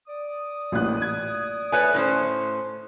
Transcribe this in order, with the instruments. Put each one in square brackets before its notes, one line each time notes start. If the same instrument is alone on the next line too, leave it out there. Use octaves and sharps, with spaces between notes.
[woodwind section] D5 D#6
[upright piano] A1 A#2 F#6
G#6
[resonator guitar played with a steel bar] A3 B4 C#5 [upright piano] G#5
[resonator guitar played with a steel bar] A2 C#4 C5